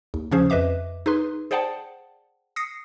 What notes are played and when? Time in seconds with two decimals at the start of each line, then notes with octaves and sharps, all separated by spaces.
0.14 D#2
0.32 C#3 F3 C#4 G#4 C5
0.50 F2 B4 D#5 E5 D6
1.06 D#4 G#4 B4 C6
1.51 G#4 C5 D5 F#5 G5 A5
2.56 D#6 A#6 C7 C#7